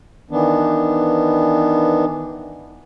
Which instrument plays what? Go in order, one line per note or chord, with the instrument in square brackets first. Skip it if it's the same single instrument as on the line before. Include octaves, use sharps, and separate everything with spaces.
[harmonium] D#3 E3 B3 D4